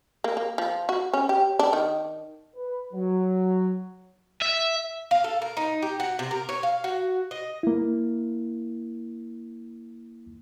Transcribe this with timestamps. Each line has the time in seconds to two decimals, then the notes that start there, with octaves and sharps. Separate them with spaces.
0.24 A#3
0.37 A#3
0.58 F3
0.89 F#4
1.13 C#4
1.29 G4
1.59 D4
1.73 D#3
2.56 B4
2.94 F#3
4.42 E5
5.11 F5
5.24 A4
5.42 A#4
5.57 D#4
5.82 G4
6.00 F#4
6.19 C3
6.31 A#4
6.49 C#5
6.63 F5
6.84 F#4
7.31 D#5
7.63 A#3 E4